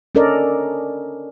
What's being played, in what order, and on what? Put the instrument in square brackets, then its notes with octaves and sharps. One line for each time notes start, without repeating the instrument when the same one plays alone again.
[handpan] C#4 D4 A4 A#4 D5 D#5